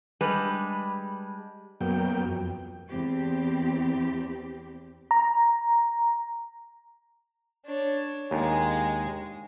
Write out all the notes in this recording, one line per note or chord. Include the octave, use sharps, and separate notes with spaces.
G3 G#3 D4 B4
F#2 F#3 A#3 B3 G5
F2
E2 C4 G4
A#5
D4 C#5
D#2 G#3 G#4